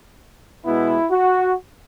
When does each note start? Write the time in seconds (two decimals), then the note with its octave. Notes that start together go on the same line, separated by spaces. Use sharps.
0.65 B2 G#3 B3 E4
1.11 F#4